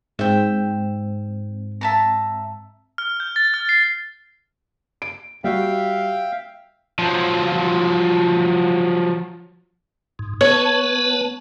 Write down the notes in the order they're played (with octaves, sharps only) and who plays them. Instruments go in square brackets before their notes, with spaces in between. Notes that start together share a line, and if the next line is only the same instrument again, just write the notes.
[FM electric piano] G#2 C4 [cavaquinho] E5 G5
[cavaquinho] E5 A5 A#5
[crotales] F6
G6
A6
F6
C7
[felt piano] D7
[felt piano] G3 F#4 [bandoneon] E5 F5 G5
[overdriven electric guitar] F3 F#3
[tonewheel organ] G#2
[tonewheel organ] B3 B4 A5 [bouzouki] C#5